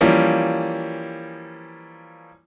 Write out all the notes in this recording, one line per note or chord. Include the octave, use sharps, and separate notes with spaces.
E3 F3 G3 A#3 C#4